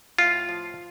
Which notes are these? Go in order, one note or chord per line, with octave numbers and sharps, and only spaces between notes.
A2 F4
F3